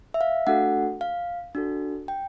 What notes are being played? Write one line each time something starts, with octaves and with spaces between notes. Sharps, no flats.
E5
F5
A3 D4 F#4 A4 F#5
F5
D4 F#4 A4
G5